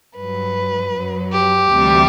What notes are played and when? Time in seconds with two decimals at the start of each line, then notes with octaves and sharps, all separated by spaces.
0.18 G2 F#3 B4
0.94 F#2 F#3
1.33 G4
1.71 D2 C3 E3 G3